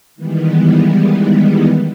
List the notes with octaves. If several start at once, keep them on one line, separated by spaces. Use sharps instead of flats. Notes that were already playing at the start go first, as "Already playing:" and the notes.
D#3 E3 G3 G#3 B3